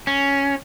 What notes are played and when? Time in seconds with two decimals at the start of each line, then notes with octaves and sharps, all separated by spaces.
0.07 C#4